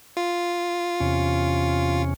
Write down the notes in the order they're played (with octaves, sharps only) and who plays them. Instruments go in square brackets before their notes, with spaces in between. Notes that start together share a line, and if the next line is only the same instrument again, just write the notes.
[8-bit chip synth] F4
[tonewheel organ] E2 C3 C#4